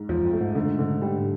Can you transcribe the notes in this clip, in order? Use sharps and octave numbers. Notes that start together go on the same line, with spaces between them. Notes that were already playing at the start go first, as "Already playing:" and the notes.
Already playing: G#2
E2 F3
F2
A3
G#2
D3
D3
G3